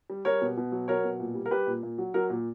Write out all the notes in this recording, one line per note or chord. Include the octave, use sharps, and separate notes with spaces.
G3
G3 A#4 C#5
B2
B2
F#3
F#3 A#4 C#5
B2
A#2
G3
A#4
G3 G4 B4
A#2
A#2
F#3
F#3 A#4
A#2